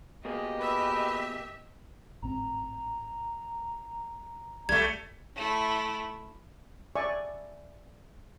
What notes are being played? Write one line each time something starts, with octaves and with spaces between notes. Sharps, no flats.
B2 A#3 G4 G#4 D#5
B4 E5
G#1 A2 C4 A#5
C2 G3 A3 G#6
A3 E4
D5 E5 G#5 C#6